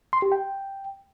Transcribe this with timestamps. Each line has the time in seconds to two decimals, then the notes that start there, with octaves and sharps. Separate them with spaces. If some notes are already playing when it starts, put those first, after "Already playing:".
0.13 C6
0.22 G4
0.32 G5